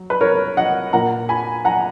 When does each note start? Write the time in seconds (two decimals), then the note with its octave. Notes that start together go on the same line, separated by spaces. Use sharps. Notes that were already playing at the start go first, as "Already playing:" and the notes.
Already playing: F#3
0.10 B4
0.21 A#4 C#5
0.57 D#5 F#5
0.93 A#2 A#3 F#5 A#5
1.29 G#5 B5
1.65 F#5 A#5